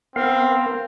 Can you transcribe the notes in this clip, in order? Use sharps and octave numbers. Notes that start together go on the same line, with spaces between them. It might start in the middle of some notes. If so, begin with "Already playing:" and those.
B3 C4 A#4 F5